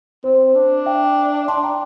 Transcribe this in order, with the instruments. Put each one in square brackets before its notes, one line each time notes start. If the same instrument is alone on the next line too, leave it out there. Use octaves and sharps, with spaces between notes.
[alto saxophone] C4 [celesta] C5
[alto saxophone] D4
[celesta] E5 G5
[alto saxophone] D4 [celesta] A5 C6
[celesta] G5 A#5